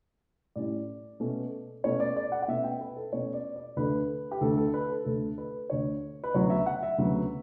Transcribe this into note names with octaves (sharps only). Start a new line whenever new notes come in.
A2 G3 C#4 D5
B2 A3 C#4
B2 A3 C#4 C#5
D5
D5
F#5
F#5
B2 A3 C#4 E5
G5
B4
A4
B2 A3 C#4 C#5
D5
D5
D2 D3 A3 B4
G4
D2 D3 A3 A4
A4
B4
A4
D2 D3 A3 A4
B4
D2 D3 A3 C#5
B4
D2 C#3 F#3 B3 C#5
E5
F#5
E5
D2 C#3 F#3 B3